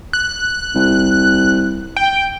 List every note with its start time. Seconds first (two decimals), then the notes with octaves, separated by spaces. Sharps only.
0.13 F#6
0.75 C2
1.97 G5